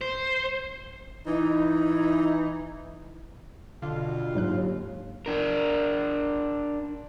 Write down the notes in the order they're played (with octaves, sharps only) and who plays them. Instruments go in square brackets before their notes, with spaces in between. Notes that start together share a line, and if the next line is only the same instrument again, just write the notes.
[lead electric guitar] C5
[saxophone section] E3 D#4
[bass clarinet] B2 [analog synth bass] D3 [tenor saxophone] F4
[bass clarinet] D#2 [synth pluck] G#2 F#3 F#6
[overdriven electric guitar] D4 A#4